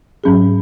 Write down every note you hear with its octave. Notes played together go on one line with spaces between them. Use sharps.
G#2 F#3 C#4 G#4